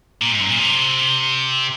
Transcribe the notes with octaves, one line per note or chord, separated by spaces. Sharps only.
A#2
G#2
F#2
A#2
C3